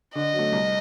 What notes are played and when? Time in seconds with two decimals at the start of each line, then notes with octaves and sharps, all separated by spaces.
0.14 D3 D#5
0.33 F#3
0.39 A3
0.52 C2